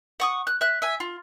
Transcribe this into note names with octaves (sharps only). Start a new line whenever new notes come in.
F#5 C#6 D#6
F#6
E5 F#6
E5 G#5
F4